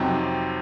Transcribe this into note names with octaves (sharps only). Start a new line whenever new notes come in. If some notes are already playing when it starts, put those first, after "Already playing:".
Already playing: F2 C3 F#3 C4 D#4